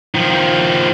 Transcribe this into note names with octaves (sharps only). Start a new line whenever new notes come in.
D#3 F3